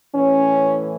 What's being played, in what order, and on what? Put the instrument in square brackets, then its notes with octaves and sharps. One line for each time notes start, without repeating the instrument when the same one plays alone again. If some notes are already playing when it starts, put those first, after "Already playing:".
[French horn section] A2 E3 C#4